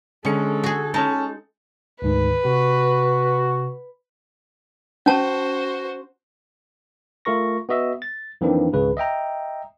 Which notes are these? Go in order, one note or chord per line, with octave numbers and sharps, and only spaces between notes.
D3 G#3 C#4 A4 C#7
F#4 G#4
G#3 C#4 D#4 A5 A6
D2 G#2 D#3 B4
C3 F#4
C#4 F#4 C5 A5
A3 F4 A#4 C#6 A#6
B3 F#4 D#5 E5
A6
F2 D#3 E3 A#3 C4 D4
G#1 C#2 C#3 B4
D#5 E5 G5 A#5